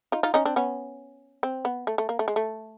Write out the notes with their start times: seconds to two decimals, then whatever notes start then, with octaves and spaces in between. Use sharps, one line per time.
0.12 D#4 F4
0.23 D#4 F4
0.34 C#4 D#4
0.45 C4 D4
0.56 B3 C#4
1.43 C4
1.65 B3
1.87 A3
1.98 A3
2.09 A#3
2.19 A3
2.28 G#3
2.36 A3